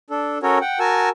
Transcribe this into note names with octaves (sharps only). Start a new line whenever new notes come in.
D4 A4
C#4 F#4 A4 A#4 C#5
F#5 G5
F#4 A#4 G#5 A5 E6